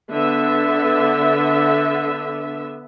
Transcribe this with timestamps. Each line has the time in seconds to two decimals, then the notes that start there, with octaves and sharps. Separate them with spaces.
0.12 D3 B3 E5